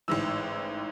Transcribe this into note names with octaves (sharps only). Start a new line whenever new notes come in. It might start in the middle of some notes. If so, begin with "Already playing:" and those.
A1 G#2 E3 E6